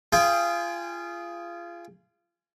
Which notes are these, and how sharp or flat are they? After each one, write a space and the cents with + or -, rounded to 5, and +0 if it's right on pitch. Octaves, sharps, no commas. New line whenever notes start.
F4 -25 G#4 +0 G5 +20